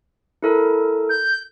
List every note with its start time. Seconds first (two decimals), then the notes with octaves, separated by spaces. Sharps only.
0.43 E4 A4 A#4
1.09 G6